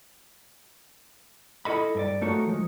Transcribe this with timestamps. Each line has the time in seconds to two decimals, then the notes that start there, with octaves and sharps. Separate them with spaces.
1.65 E4 A4 D#5 B5
1.95 G2 A#4 D5
2.21 A3 D#4 F#4 A4 A#4 C#5
2.47 F3 G#3